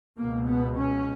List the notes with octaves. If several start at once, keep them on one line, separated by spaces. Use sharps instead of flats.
C#2 B2 A#3
B3
C#4